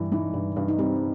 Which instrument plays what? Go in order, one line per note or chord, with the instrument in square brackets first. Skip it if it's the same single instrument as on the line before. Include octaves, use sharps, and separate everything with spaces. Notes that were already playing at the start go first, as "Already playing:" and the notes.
Already playing: [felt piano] G2 E3 G3
[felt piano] E3 [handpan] D#4
[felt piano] G2
G2
[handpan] D#4
[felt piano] G3 [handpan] C4